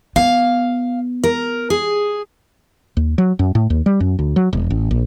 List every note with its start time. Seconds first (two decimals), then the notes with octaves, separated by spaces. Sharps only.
0.16 B3 F5
1.24 A#4
1.70 G#4
2.97 D#2
3.18 F#3
3.39 F#2
3.55 A2
3.70 D#2
3.86 G3
4.00 F#2
4.19 D2
4.36 F#3
4.53 E1
4.70 A1
4.91 A#1